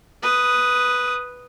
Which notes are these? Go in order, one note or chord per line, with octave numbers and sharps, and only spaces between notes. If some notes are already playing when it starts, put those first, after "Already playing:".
B4 D#6